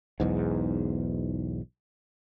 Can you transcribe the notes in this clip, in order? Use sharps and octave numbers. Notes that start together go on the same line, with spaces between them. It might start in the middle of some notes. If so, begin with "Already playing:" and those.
B1 E2 G#2